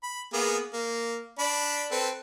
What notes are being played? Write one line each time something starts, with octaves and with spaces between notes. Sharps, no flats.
B5
A#3 B3 G#4
A#3
D4 D5 B5
C4 A4 B4